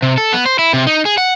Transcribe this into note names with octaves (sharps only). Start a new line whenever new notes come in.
C3
A4
B3
C5
E4
C3
D#4
G#4
F#5